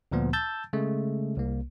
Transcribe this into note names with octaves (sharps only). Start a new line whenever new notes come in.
D2 A#2 F3 B3
A5 E6 G6 A6
C#3 G#3 A3
C2 A#3